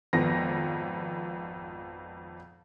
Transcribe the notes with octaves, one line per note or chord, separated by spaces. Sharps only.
G#1 F2 B3 A#6